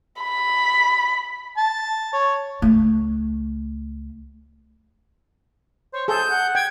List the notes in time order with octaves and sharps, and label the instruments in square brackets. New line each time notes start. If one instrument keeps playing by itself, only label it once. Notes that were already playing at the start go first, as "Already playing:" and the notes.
[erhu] B5
[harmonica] A5
C#5
[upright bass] C#2 A3
[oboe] C5 [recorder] C#5
[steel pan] G#4 A4 [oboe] C5 [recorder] G6
[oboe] F#5
[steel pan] G5 [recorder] G#6